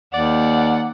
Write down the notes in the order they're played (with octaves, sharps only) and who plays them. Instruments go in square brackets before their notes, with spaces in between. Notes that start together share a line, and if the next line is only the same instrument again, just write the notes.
[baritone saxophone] D#2 [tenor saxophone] D5 [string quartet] F#5